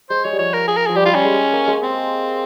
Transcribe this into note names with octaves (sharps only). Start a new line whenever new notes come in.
G#3 C5
G#3 C#5
G3
F3 C#5
A#4
G#4
A#4
F3 G#4
G3 G4
F4
G3 C#4
G#3
A#3
G#3
C4